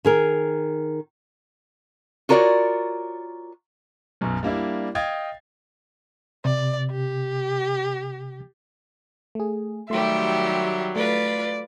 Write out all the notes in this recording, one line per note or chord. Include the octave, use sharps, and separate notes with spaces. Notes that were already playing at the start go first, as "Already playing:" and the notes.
D#3 G#4 A#4
F4 F#4 A#4 C#5 D5
B1 F#2 B2
G3 A#3 D4 E4
D#5 F5 G5 D#6 G#6 A6
C3 D5
G4
A3 G#4
D#3 F#3 G3 A3 G4 E5 C6
A3 F4 B4 D5